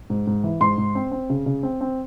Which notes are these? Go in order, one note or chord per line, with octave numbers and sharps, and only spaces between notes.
G#2
G#2
E3
G#2 C6
G#2
C4
C4
C#3
C#3
C4
C4